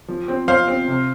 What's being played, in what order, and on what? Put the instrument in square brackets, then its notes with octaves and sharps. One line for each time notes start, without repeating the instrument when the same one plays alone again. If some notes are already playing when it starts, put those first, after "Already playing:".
[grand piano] F3
C4
F3 C5 F5
C4
C3